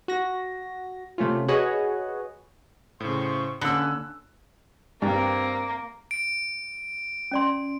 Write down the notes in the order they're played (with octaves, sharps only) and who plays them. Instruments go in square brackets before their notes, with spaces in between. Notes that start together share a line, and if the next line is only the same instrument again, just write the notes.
[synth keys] F#4 A#6
C3 A3 C#4 F4
F#4 G#4 B4 C#5 D#5 F#5
[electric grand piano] A2 C#3 [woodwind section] C5 C6 C#6
[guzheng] D3 [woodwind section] A#3 C#4 [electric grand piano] B5 [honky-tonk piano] E6 F#6
[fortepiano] G2 [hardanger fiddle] A#3 [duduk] C4
[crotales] D7
[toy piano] C#4 D5 C6